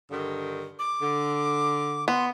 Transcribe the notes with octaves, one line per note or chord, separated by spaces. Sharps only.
G2 D3 D#3
D6
D3
B3 C6